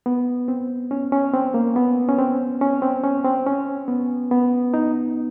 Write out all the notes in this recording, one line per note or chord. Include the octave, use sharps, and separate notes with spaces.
B3
C4
C#4
C#4
C4
A#3
B3
C#4
C4
C#4
C4
C#4
C4
C#4
B3
B3
D#4